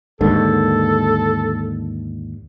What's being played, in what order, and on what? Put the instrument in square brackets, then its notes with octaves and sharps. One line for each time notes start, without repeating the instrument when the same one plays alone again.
[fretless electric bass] D#2 G#2 D3 [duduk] A4